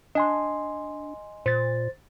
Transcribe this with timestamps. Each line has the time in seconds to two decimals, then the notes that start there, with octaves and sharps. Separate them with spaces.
0.15 D4 D#5 G#5 C6
1.46 A#2 C5 A6